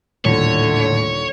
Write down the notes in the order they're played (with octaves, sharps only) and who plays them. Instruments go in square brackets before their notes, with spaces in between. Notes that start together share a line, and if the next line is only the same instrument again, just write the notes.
[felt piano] D#1 [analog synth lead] A2 [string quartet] D3 [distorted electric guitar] C#5